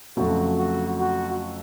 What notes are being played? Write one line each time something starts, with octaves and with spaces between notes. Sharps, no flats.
F2 C#3 F#3 A3 F#4
F#4
F#4